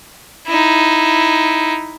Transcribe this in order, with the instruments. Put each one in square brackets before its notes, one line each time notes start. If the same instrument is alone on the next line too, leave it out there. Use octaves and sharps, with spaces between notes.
[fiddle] D#4 E4